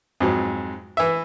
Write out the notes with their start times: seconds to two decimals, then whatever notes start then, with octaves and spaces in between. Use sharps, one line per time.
0.20 F2 G#2 F#3
0.97 E3 E5